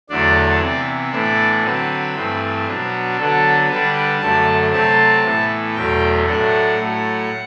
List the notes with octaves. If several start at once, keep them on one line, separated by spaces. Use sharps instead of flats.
E2 D3 F#3 A3 D4 D5
C3 E3 B3
A2 E3 B3 D4 D5
D3 F#3 C4 B4
G2 E3 A3 C4
B2 F#3 B3 D4
D3 F#3 B3 D4 A4
D3 G3 D4 B4
F#2 D3 A3 A5
C3 F#3 A3 C4 A5
A2 E3 B3
E2 B2 F#3 A3 G5
A2 F#3 A3 D4 F#5
A2 F#3 A3